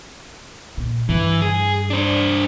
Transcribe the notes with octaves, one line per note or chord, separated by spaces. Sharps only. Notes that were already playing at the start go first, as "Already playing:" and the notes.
A#2
G2 E3
G#4
D4 C5